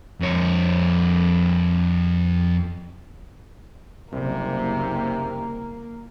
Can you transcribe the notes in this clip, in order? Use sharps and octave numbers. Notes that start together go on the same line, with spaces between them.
F2 C#5
F#1 C2 C3 A#3